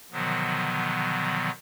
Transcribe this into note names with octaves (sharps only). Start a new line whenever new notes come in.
B2 D3 D#3 F3 F#3 B3